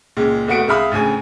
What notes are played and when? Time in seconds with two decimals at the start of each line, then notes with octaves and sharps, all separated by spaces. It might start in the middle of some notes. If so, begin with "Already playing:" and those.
0.17 C#2 A#2 G#3
0.48 F1 A3 B3 F#4 C#7 D7
0.68 C2 G#3 E5 F5 B5 D#6
0.91 A1 D2 C#3 G#5